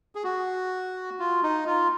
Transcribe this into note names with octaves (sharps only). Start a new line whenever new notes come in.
G#4
F#4
F4
D#4
F4